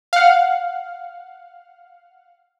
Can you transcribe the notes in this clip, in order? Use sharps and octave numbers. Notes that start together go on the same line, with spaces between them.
F5 F#5